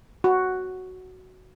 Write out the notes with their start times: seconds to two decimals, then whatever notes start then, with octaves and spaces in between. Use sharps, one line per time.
0.24 F#4